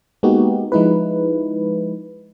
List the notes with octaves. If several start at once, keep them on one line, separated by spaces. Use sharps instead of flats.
G#3 A#3 B3 D#4 F#4 G4
F3 G#3 D#4 E4 B4